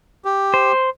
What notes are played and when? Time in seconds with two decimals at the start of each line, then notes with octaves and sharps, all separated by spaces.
0.25 G4
0.54 C5